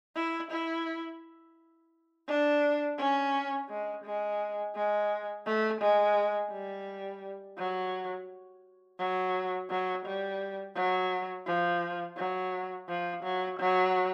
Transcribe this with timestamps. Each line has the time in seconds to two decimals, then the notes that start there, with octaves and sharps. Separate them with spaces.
0.16 E4
0.51 E4
2.27 D4
2.98 C#4
3.69 G#3
4.04 G#3
4.76 G#3
5.46 A3
5.81 G#3
6.52 G3
7.58 F#3
8.99 F#3
9.70 F#3
10.06 G3
10.76 F#3
11.47 F3
12.17 F#3
12.88 F3
13.23 F#3
13.59 F#3